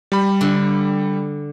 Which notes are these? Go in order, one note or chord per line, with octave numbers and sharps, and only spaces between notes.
G3 B5
D3